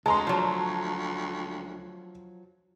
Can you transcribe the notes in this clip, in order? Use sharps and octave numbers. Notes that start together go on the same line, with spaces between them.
D2 G#3 A5 A#5 C6
F3 F#3